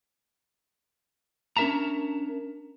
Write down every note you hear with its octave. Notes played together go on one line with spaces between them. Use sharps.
C#4 D4 A#4 E5 A5 A#5